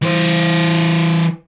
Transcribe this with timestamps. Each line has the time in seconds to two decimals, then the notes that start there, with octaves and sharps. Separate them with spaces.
0.02 E3 C5